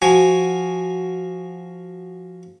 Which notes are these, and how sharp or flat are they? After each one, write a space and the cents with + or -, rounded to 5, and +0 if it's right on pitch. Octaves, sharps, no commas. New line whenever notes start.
F3 +0 F#4 +5 G#5 -5